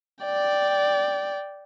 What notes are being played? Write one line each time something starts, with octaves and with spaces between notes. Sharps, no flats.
D5 G5